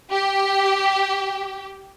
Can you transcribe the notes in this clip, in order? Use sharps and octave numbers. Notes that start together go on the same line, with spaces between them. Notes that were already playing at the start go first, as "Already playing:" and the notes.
G4